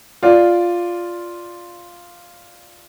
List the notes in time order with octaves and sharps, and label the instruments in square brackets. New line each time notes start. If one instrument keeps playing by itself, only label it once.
[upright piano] F4 D5